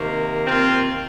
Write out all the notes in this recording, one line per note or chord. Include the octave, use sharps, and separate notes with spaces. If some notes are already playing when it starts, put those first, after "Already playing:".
Already playing: C3 D#3 A#3
C4 F4